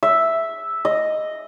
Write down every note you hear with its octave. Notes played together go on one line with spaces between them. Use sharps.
E5
D#5